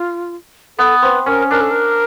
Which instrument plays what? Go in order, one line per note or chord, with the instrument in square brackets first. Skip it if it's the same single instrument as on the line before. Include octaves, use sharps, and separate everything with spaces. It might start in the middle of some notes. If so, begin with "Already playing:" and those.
Already playing: [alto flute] F4
[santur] B3 [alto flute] A4
[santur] C4 [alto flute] B4
[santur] C#4 [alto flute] A#4
[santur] D4 [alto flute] A#4
[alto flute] A4
A#4